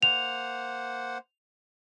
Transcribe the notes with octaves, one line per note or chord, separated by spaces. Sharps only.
A#3 C5 F#5 F7